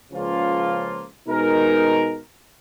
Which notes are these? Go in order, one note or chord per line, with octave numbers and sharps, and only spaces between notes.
C#2 C#3 F3 A#3 F4
B2 G#3 D#4 A#4